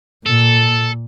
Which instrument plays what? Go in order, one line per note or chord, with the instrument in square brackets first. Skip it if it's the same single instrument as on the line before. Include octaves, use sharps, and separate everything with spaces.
[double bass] A#2 [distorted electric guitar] A4